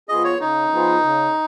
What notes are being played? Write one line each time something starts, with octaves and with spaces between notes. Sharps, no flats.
F3 B3 F4 G#4 D#5
C#5
C#3 D#4
F3 B3 F4 G#4
C#3